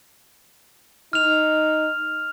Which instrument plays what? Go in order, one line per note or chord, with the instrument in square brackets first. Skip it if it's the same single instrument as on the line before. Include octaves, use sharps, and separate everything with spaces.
[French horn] D#4 [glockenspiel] F6 F7